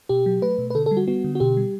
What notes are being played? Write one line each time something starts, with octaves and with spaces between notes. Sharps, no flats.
B2 G4
F#3
A3 B4
B2
B4
D3 A4
A4
G3
F#4
B3 F#4
D3
F#4
B2 G4
G3